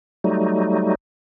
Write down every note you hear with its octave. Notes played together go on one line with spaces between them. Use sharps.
F#3 G3 A3 D#4